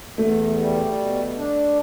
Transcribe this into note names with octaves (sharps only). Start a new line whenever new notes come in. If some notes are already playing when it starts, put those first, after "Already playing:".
E2 A3
G3
B2
D4